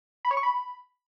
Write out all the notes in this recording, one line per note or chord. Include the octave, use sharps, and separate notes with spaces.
B5
C#5
C#6
B5